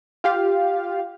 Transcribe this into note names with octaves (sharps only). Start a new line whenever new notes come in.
F4 G4 F5